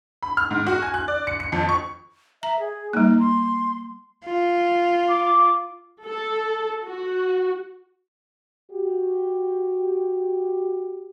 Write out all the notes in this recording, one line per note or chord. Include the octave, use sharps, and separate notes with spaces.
B5
F6
G#2
F#4
G#5
F#6
D5
C#7
C#7
F2
C#6
E5 A#5
G#4
G3 A#3 D#4
C6
F4
D6
A4
F#4
F#4 G4